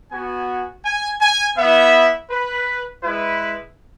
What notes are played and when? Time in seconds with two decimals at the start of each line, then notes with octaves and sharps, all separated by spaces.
0.12 B3 F#4 G#5
0.86 G#5
1.22 G#5
1.58 B3 E4 E5
2.31 B4
3.04 G#3 E4 B4